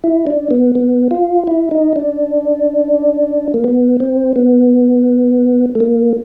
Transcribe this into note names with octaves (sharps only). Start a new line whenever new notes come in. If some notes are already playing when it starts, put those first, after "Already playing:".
E4
D4
B3
B3
F4
E4
D#4
D4
A#3
B3
C4
B3
A3
A#3